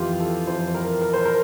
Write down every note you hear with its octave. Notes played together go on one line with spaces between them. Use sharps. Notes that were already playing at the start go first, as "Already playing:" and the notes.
Already playing: F2 E3 F4 G4
A4
F2 E3 C5
A#4
A#4
C5
A#4